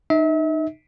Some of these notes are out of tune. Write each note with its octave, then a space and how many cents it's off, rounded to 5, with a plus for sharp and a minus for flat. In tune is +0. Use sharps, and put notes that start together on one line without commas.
D#4 -20 E5 -40